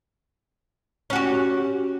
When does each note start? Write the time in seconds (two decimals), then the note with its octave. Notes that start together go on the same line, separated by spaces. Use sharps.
1.10 C#4
1.13 F#4
1.16 G4